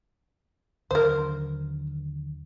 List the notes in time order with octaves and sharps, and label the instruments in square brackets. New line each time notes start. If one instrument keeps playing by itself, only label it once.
[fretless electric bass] D#2 D3 F#3 [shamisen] A#4 C5